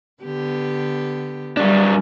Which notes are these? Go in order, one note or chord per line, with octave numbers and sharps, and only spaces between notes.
D3 B3 G4
F#3 G3 D4